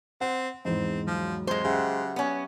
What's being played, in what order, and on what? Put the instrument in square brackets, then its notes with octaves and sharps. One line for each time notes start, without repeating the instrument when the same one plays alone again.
[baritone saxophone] C4 [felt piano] F#5
[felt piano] E2 G#2 [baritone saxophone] C4
[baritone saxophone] F3 [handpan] F#3
[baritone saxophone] F2 [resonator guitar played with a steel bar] G#3 C5
[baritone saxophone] C#3 [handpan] G4 E5 F#5
[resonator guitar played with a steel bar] B3 C#4